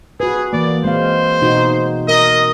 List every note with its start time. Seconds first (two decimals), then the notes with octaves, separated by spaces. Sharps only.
0.20 F#4 G#4 B4
0.53 E3 A#3 D5
0.84 G#3 C4 C5 F5
1.42 B2 D#4 F#4
2.08 A#4 D#5